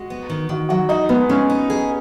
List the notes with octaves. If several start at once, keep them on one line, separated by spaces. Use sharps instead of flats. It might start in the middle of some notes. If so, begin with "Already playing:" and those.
Already playing: G#3 F#4
B3
D#3
D#3 F#4
F#3 F#4
D#4 F#4
G#3 B3
G#3 C#4
D#4
G#4